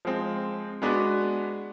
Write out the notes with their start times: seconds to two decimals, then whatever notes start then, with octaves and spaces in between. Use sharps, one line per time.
0.05 F3 G#3 C4
0.82 G#3 B3 D4 F#4 B4